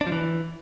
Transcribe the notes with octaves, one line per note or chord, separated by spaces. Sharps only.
D4
F3
E3